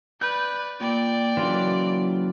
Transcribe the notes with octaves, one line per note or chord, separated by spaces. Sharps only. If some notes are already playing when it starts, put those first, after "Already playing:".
B4 D5 G6
A#2 D5 G5
C#3 E3 F#3 A#3 F4